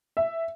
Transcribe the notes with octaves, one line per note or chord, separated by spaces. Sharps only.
E5